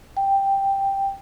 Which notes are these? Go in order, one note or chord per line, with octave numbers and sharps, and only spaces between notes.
G5